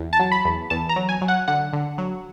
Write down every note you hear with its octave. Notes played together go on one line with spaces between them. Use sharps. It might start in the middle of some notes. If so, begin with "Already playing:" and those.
Already playing: E2
A5
F#3
B5
E2
E2 A5
A#5
F#3
G#5
F#3
F#5
D3 F#5
D3
F#3